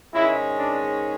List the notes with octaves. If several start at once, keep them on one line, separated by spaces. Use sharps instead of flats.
G#2 D#3 G#3 C#4 E4
D4